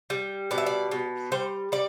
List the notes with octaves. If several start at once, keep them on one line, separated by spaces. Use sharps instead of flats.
G3
B2 D5
E5
D5
B2
G3 C5
G3 D5